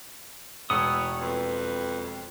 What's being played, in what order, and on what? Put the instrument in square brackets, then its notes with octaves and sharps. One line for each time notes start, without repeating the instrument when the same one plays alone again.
[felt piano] E1 E6 [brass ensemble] C#2 A2 C#5 [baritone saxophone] B3 [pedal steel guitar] D#6
[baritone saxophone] F2 [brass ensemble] B4